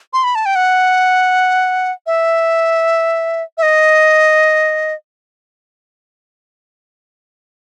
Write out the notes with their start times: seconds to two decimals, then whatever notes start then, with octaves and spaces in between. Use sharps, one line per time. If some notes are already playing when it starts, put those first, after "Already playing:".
0.13 C6
0.24 B5
0.35 A5
0.46 G5
0.56 F#5
2.06 E5
3.58 E5
3.63 D#5